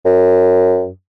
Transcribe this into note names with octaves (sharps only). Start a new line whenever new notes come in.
F#2